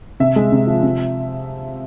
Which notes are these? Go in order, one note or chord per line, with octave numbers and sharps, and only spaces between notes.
C3 E5
G#3
C3
F3
C3